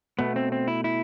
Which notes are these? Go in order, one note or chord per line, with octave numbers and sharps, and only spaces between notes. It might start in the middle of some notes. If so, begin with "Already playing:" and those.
B2 A3 B3
C4
C4
E4
E4